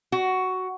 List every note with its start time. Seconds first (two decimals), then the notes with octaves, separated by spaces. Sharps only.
0.12 F#4